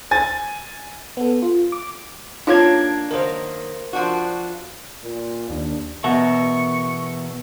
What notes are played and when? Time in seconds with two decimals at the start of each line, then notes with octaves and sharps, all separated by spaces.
0.11 G#5 A6
1.17 B3 A4
1.42 F4
1.72 D6
2.47 A#3 D4 D#4 F4 C#5 F5 G#6
3.11 D#3 F#3 A#3 A#4 C5
3.93 F3 D4 F#4
5.03 A#2
5.50 D#2 D4
6.04 E2 B2 A#4 E5 C#6